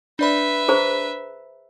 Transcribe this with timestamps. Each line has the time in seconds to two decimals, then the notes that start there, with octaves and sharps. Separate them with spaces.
0.19 D4 B4 D5 E5 B5
0.68 G#4 C5 A#5